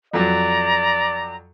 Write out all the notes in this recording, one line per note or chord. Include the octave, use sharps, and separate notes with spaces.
F2 F#3 D5 A#5